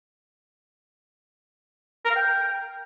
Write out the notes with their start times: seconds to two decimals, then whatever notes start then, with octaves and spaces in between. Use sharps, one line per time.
2.05 A#4
2.10 F5
2.15 G5